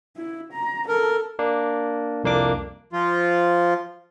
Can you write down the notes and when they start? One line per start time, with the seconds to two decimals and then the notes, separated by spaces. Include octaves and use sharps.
0.16 E4
0.53 A#5
0.88 A4 A#4
1.39 A#3 D4
2.24 C2 F2 A#3 D4 D6
2.93 F3 F4